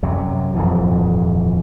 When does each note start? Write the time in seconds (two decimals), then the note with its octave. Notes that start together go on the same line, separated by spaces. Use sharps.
0.03 F#2 C3 F#3
0.54 D#1 F2 G#2 E3